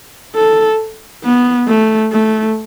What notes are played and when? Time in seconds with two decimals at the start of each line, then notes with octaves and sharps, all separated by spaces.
0.35 A4
1.24 B3
1.68 A3
2.12 A3